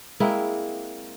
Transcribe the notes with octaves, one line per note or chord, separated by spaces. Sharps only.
G#3 A#3 C4 E4